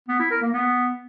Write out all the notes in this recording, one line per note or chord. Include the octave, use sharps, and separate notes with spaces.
B3
E4
A#4
A#3
B3